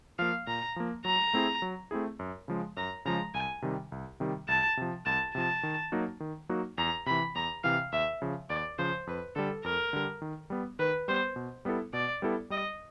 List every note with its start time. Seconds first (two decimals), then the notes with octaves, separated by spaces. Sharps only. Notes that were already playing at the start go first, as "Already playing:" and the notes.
0.19 F3 A#3 F5
0.47 A#2 A#5
0.76 F3 A#3
1.05 F#3 A#5
1.34 A3 C4 E4 G#4
1.62 F#3
1.91 A3 C4 E4 G#4
2.19 F#2
2.48 C#3 F3 G#3
2.77 F#2 A#5
3.05 C#3 F3 G#3 A#5
3.34 C2 G#5
3.62 C3 D#3 G3
3.92 C2
4.20 C3 D#3 G3
4.48 C2 A5
4.77 C3 F3
5.05 C2 A5
5.34 C3 F3 A5
5.63 D#3
5.92 F#3 A#3 D#4 F#4
6.20 D#3
6.49 F#3 A#3 D#4 F#4
6.78 E2 A#5
7.06 C3 B5
7.11 E3
7.35 E2 A#5
7.64 C3 E3 F5
7.92 D#2 E5
8.22 C#3 F3
8.49 D#2 D5
8.78 C#3 F3 C5
9.07 F2 B4
9.35 D3 G3 A4
9.64 F2 A#4
9.93 D3 G3
10.22 D#3
10.50 G3 B3
10.79 D#3 B4
11.08 G3 B3 C5
11.36 B2
11.65 G3 B3 E4 A4
11.93 B2 D5
12.22 G3 B3 E4 A4
12.50 G3 D#5